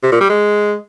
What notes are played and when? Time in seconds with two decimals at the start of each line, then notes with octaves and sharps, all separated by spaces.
0.03 C3
0.12 A#2
0.21 G3
0.29 G#3